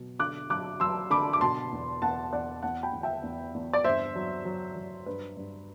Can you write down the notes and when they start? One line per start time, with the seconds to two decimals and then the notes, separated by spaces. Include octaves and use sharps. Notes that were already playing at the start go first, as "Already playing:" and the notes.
Already playing: B2 F#3
0.19 D3 D6 F#6
0.50 F#3 D6 F#6
0.80 F#3 C6 E6
1.10 D3 B5 D6
1.33 D6
1.41 B2 A5 C6
1.72 E2
2.02 E2 F#5 A5
2.33 E2 D5 F#5
2.63 E2 F#5 A5
2.83 G5 B5
2.93 E2
3.03 E5 G5
3.23 E2
3.54 E2
3.73 D5
3.84 G2 C5 E5
4.15 F#3
4.45 F#3
4.76 F#3
5.06 G2 B4
5.37 G2